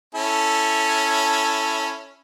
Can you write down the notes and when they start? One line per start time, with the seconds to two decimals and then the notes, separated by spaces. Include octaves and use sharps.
0.15 C#4 E4 A4